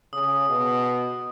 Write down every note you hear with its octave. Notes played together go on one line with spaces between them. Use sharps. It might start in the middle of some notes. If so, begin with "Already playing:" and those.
C#3 D#6
B2